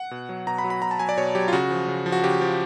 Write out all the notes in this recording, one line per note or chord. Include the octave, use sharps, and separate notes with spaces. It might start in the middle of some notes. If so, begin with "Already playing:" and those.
Already playing: F#5
B2
F#3
B2 A#5
B5
F#3
B5
B2 A#5
A5
F#3 G#5
D5
B2 C#5
F#3 G4
F4
C#3 F#4
F3
C#3
F3
F#4
C#3 G4
F3